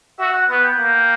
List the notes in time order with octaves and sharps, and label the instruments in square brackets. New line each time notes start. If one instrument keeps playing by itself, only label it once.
[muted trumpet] F#4 [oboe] E5
[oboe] F#5
[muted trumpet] B3 [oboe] F#5
[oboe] G5
[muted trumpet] A#3